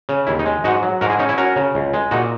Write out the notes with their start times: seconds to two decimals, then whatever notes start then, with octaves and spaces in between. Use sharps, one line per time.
0.09 C#3
0.27 D#2 E4
0.39 D#4
0.46 G#3
0.64 G#2 D#4 F#4
0.83 F#3
1.01 G#2 F#4 A#4
1.10 E4 G#4
1.19 C#4 D#4
1.29 E4
1.38 C#4 F#4 A#4
1.56 C#3
1.75 C#2
1.93 G#3
2.11 A#2 D#4 F#4